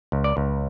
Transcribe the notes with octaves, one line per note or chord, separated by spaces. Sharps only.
C#2
D5
C#2